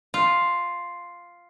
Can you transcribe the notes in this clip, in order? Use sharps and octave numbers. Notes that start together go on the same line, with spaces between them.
F4